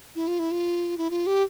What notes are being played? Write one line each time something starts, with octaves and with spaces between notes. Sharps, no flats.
E4
F4
E4
F4
E4
F4
G4